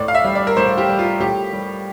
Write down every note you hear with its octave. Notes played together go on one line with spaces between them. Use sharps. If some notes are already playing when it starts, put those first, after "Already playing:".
Already playing: A2 D5
F5
E5
G3
D5
A#4
A2 C5
G4
G3
F4
A2 G4
G3